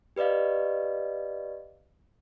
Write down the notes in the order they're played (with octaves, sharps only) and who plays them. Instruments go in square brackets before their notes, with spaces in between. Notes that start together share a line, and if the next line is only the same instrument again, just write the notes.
[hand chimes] G4 B4 D5 D#5 F5